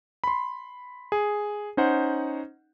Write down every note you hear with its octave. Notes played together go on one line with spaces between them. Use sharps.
B5 C6
G#4
C#4 D#4 C5 F#5